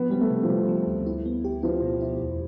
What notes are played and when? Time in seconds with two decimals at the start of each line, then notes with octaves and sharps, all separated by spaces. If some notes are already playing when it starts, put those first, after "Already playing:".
Already playing: F3 B3
0.10 G3 C4
0.21 A3
0.30 C3
0.43 F3
0.49 C3 G3
0.68 F3
0.87 D2
1.06 E4
1.25 B3
1.44 G4
1.63 F3 E4
1.82 B2
2.01 E4
2.20 E2